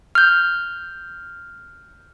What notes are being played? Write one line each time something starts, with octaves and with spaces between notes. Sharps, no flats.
F6 G6